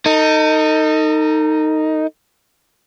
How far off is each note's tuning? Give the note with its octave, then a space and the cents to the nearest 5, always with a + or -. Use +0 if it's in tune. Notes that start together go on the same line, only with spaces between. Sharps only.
D#4 +0 A4 +45